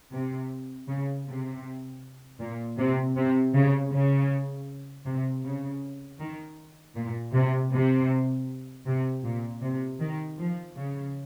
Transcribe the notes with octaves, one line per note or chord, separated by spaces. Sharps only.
C3
C#3
C3
A#2
C3
C3
C#3
C#3
C3
C#3
D#3
A#2
C3
C3
C3
A#2
C3
D#3
F3
C#3